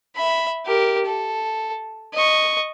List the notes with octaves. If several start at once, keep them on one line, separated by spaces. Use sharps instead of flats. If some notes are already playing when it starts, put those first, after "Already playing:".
E5 B5
G4 A#4
A4
D#5 C#6